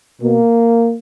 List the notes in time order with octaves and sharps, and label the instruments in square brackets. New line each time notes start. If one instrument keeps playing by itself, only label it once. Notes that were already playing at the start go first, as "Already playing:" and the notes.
[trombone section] B2 A#3